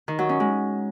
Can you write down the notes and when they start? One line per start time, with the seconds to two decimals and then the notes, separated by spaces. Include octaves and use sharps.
0.08 D#3
0.19 F#3
0.29 C#4
0.40 G#3